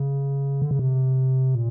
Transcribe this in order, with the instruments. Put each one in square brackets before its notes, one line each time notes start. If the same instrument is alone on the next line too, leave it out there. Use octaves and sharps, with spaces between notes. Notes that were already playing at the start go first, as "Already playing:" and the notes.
Already playing: [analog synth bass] C#3
D3
C#3
C3
A#2